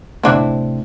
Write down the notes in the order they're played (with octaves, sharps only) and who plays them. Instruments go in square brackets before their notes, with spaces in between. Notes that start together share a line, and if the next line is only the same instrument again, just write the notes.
[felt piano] A2 C3 [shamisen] C4 D4 E4